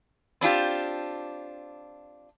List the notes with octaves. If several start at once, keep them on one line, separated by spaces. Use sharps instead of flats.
C4 D4 F4 G4